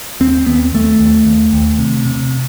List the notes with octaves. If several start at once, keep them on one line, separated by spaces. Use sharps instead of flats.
D#2 C4
D#2 B3
D#2 A3
D#2
D#2
D#2
C3
C3